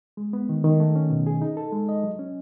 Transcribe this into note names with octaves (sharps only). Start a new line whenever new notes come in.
G#3
B3
D#3
D#3
A3
C#4
B2
G#4
D#4
A4
G#3
D#5
F#3
C#4